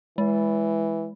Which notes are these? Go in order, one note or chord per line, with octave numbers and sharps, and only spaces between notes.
E3 G#3